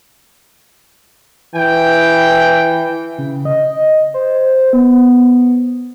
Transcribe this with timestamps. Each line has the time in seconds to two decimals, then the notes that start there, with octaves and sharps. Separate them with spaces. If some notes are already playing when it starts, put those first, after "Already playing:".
1.55 E3 G5
3.18 C#3
3.45 D#5
4.14 C5
4.73 B3